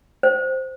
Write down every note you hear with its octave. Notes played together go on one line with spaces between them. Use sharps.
C5